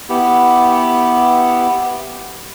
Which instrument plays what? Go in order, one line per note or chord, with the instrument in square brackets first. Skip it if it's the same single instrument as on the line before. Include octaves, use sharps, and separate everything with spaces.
[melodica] B3 E4 G4